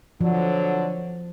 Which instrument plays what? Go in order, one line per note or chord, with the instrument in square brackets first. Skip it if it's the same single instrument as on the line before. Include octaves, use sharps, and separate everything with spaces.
[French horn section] D3 F#3 [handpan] F3